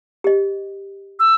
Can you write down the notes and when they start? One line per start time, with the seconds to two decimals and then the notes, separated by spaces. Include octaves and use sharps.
0.24 G4 D#5
1.20 E6